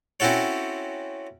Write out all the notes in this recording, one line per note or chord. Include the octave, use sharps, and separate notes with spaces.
C4 C#4 E4 F#4 A4 C#5